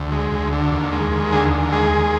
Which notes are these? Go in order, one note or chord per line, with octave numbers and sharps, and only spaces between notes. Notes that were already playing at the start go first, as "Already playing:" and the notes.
Already playing: D2
G#3
D2
D3
D#2
G#3
D#2
D3 G#4
D#2
G#3 G#4
D#2